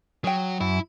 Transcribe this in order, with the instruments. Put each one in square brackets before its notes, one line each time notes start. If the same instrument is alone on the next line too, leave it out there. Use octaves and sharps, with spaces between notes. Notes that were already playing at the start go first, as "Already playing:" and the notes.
[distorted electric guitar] F#3 [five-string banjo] G#4 G5
[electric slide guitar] F#2 [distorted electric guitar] E4